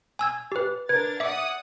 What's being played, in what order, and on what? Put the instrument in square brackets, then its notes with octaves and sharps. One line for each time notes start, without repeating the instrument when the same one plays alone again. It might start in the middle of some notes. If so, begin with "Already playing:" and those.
[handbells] G#5 E6 G#6
G4 B4
[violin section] D4 A#4 A6 [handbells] B4 [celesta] G#6
[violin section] D5 F#5 D#6 [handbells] E5 D6